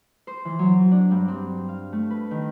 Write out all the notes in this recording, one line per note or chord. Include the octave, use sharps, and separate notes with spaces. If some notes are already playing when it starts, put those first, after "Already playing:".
C5
E3
F#3
D4
G2
C4
F5
A3
B4
D#3